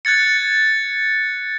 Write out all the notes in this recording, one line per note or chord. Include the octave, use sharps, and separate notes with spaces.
F#6 G#6 A6 C#7